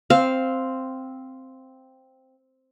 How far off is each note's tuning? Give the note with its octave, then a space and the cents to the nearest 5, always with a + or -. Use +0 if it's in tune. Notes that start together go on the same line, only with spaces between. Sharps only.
C4 +0 F5 +0